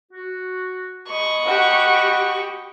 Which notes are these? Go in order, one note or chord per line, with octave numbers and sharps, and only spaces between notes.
F#4
D#5 B5 C#6
F#4 G4 F#5